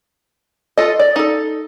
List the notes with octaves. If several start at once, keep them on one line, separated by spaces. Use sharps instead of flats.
F4 A4 D#5
D5
D#4 A4